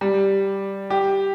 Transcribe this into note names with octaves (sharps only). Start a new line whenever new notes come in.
G3
G4